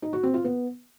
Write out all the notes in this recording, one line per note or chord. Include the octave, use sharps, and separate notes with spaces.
D#4
F#4
C4
F4
B3